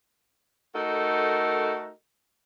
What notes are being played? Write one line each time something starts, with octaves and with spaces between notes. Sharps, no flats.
A3 D#4 F#4 A4 A#4